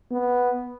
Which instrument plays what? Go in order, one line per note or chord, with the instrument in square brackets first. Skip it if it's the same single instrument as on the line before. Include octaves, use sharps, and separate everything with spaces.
[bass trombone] B3